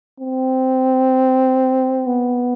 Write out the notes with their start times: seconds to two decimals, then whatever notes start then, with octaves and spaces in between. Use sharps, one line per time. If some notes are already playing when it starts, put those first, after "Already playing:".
0.20 C4
2.07 B3